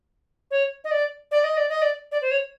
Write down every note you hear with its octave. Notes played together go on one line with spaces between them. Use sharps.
C#5
D#5
D5
D5
D#5
D5
D#5
D5
D5
C5
C#5